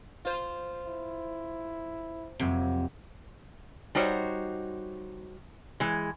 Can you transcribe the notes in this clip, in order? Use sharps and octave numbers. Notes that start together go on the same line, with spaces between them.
F4 C5
E4
F2 C3 F#3 A#3
G3 D#4 F#4 C5 C#5
E3 G#3